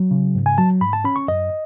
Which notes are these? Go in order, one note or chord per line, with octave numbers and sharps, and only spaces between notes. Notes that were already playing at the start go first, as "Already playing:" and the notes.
Already playing: F#3
C#3
G#2
G#5
F#3 A5
G#2 B5
A5
C#4 B5
C#6
F#2 D#5